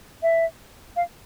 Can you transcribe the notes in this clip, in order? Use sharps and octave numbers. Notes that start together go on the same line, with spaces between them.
E5
F5